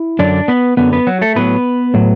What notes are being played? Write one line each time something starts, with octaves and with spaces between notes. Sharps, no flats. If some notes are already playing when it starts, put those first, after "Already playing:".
Already playing: E4
F#2 D3 F#3 D4 D5
B3 B4
F#2 D3 F#3 B3 B4
B3 B4
F#3 F#4
A3 A4
A2 F#3 B3 B4
A2 F#3